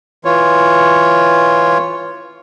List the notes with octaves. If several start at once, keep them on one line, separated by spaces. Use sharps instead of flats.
E3 F4 C#5